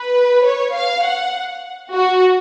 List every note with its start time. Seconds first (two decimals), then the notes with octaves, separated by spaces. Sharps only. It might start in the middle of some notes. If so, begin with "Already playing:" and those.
Already playing: B4
0.46 C#5
0.76 F5
1.05 F#5
1.92 F#4